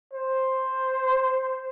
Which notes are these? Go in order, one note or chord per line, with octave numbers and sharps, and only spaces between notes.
C5